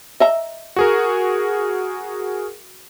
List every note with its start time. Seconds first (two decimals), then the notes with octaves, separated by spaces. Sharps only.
0.20 D#5 E5 A#5
0.76 F#4 G#4 A#4